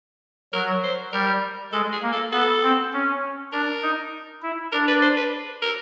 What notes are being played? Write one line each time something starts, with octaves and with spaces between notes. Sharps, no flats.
F#3 A#4
C5
G3 A#4
G#3 A4
G#4
A#3
A4
B3 A4
C4
C#4
D4 A#4
D#4
E4
D4 A#4
B4
C5
B4
A#4